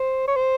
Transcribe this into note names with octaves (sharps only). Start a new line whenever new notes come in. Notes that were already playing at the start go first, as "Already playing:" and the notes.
Already playing: C5
C#5
C5